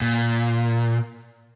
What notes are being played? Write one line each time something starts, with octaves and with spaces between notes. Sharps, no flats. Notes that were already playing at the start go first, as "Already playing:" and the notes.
A#2